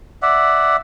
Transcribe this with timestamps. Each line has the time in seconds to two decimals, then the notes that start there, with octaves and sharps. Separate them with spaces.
0.22 D5 E5 F#5